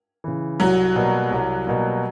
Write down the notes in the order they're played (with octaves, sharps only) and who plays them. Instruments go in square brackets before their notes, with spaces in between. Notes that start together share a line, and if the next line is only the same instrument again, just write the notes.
[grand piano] C#3 E3
[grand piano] C2 [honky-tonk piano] F#3 F#4
[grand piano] B2 G3 A#3
C2
B2 G3 A#3